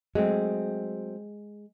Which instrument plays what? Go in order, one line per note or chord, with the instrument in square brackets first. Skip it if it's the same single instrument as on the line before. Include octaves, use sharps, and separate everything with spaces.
[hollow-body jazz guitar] F#3 A3 C4 [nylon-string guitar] G#3